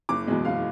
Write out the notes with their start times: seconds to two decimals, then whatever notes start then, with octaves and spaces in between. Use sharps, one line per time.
0.09 F#1 D6
0.27 E2 B2 G#3
0.45 F#1 F5